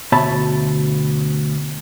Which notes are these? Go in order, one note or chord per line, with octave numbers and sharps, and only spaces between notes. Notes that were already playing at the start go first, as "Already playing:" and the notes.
D2 B2 C#5 E5 A5 B5